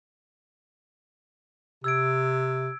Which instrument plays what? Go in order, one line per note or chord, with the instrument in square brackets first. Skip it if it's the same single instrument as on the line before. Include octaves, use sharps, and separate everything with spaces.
[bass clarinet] C3 [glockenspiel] E6 G#6 D7